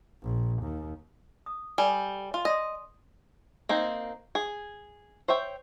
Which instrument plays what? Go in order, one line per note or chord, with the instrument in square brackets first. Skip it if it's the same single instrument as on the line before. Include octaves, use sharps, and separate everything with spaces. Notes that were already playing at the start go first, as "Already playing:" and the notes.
[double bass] A#1
D#2
[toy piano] D#6
[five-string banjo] G3 [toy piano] A4 D5 G#5
[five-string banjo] F4
[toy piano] D5 C6 D#6 [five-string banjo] D#5
[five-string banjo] A#3 C4 D#4 C5
G#4
C5 C#5 E5 G5